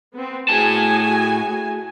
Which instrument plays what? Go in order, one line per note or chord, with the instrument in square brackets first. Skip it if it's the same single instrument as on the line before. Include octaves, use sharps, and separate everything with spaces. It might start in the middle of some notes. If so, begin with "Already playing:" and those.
[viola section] B3 C4
[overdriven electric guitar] A2 A5 [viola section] F#4 G#4 G#5